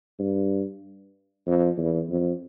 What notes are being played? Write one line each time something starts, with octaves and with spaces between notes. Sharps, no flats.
G2
F2
E2
F2